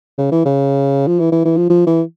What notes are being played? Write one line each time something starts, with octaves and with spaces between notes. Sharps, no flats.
C#3
E3
C#3
F3
E3
E3
E3
F3
F3
E3